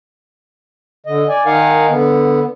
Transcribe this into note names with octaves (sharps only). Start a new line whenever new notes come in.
D3 D#5
D5 G#5
D#3 D#4 A#4 F5 F#5 G#5
D3 B3